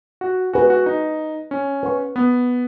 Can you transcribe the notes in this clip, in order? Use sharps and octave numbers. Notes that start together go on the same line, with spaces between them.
F#4
F#4 G#4 B4 G#5
F#4
D#4
C#4
B4 F#5 C#6
B3